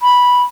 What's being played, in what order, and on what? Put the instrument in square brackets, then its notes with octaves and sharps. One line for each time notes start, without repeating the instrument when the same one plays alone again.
[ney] B5